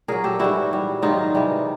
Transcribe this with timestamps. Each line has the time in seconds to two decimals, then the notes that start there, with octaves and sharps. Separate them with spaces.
0.08 A#2 F#3 G#4 A#4
0.24 G4 A4
0.39 G#2 E3 G3 E4 F#4
0.71 A#2 G3
1.02 G#2 D#3 F#3 D#4 F4
1.35 C3 E3 G3